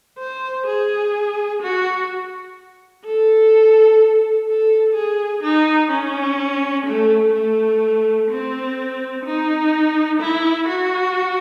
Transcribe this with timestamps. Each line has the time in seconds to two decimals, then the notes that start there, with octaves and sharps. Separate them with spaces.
0.19 C5
0.67 G#4
1.62 F#4
3.06 A4
4.48 A4
4.96 G#4
5.43 D#4
5.91 C#4
6.86 A3
7.34 A3
8.30 C4
9.25 D#4
10.20 E4
10.68 F#4